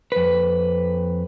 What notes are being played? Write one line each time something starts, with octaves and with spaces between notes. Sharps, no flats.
F2 B4